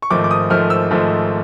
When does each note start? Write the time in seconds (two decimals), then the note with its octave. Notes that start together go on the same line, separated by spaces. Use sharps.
0.02 C#6
0.10 G#1 G#2 F3 A3 D6
0.24 D6
0.31 D#6
0.50 G#1 G#2 F3 A3 F6
0.70 E6
0.91 G#1 G#2 F3 A3